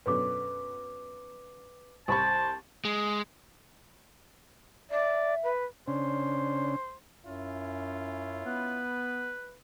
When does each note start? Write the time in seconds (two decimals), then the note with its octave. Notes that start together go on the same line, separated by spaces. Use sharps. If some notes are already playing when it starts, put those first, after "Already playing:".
0.06 F#2 B2 D3 B4 D6
2.08 C2 C5 A5 B5 C#6
2.85 G#3
4.90 D5 E5
5.43 B4
5.88 C#3 C#4 D4 C5
7.25 F#2 C#4 E4 F4
8.46 B3 B4